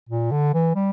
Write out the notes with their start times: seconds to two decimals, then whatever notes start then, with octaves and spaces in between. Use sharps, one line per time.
0.09 A#2
0.32 D3
0.54 E3
0.75 G3